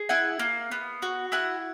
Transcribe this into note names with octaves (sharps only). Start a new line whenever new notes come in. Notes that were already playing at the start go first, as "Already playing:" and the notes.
Already playing: G#4
E4 F#5 G#5
A#3
B3
F#4
E4 F#5 G#5